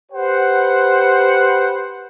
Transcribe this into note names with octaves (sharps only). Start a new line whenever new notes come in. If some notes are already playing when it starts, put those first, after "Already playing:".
G4 B4 C5 F#5